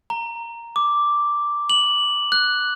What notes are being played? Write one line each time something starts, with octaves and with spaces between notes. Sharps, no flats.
A#5
D6
F#7
F#6